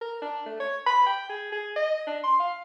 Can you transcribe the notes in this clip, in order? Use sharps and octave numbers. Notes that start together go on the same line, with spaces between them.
A#4
D4
A3
C#5
B5
G5
G#4
G#4
D#5
D4
C6
F5